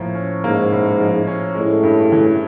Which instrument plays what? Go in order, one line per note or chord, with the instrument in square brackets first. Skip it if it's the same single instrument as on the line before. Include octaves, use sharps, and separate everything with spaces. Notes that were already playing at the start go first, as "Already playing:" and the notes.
Already playing: [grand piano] A2 F3 A#3
C#4
[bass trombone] G#2 [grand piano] A#3
[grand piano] A2
F3
C#4
[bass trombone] A2 [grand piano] G#3
[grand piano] G2
E3